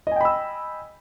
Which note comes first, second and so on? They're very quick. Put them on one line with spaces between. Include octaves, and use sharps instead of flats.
D#5 G#5 G5 B5 E6